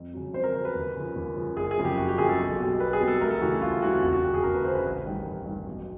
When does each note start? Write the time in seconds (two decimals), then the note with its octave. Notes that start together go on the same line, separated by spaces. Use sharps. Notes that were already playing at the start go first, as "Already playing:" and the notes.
Already playing: F2
0.13 C#3 F#3
0.33 F2 C5
0.44 A#4
0.54 C#3 F#3 C5
0.65 B4
0.75 D#2
0.96 C#3 F3
1.15 D#2
1.36 C#3 F3
1.57 F#1 G#4
1.71 G#4
1.78 F#2 C#3 F3
1.85 G4
1.97 F#1 F#4
2.09 G4
2.18 F#2 C#3 F3 G#4
2.29 A4
2.39 B1
2.59 B2 G3
2.80 B1 B4
2.93 G#4
3.01 B2 G3
3.08 A4
3.21 D2 A#4
3.31 A4
3.41 C#3 E3 G3 F#4
3.52 F#4
3.62 D2 F4
3.82 C#3 E3 G3 F#4
4.02 E1 F#4
4.13 F#4
4.23 D2 C#3 G4
4.34 G#4
4.43 E1 A#4
4.54 B4
4.64 D2 C#3 C5
4.75 B4
4.85 A1
5.06 G2 D#3 G3
5.25 A1
5.46 G2 D#3 G3
5.67 B1